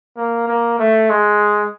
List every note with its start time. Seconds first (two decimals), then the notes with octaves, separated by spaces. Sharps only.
0.17 A#3
0.48 A#3
0.79 A3
1.10 G#3